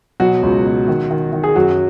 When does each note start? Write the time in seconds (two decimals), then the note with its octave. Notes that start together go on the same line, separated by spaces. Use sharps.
0.20 B2 F#3 F#4
0.43 C#2
0.66 B2
0.88 D#3
1.11 D#3
1.33 D#3
1.44 G#4
1.56 F#2 F#3 F#4